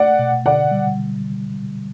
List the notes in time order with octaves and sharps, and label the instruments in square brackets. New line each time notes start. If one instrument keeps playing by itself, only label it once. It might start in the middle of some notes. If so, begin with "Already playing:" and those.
Already playing: [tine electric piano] A3 [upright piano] D5 F#5
[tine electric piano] B2
[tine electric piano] D3 [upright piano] D5 F#5
[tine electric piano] G3